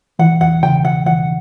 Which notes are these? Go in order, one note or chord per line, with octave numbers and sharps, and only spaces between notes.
E3 F#5
E2 F#5
C#3 G5
E2 F#5
E3 F#5